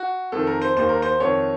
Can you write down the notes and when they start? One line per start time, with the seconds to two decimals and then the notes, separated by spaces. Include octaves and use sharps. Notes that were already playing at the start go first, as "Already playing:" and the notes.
Already playing: F#4
0.32 F2 D#3 A4
0.47 A#4
0.62 C5
0.77 D#2 D#3 C5
0.89 A#4
1.02 C5
1.20 F2 D#3 C#5